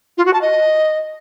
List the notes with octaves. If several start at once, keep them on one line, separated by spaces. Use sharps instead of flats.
F4
F#4
A5
D#5